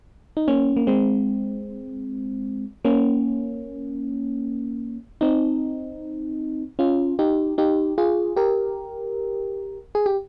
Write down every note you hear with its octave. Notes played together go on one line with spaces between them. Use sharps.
D#4
A#3 C#4
A#3
G#3 C4
A#3 C#4
C4 D#4
C#4 F4
D#4 G4
D#4 G4
F4 G#4
G4 A#4
G#4
G4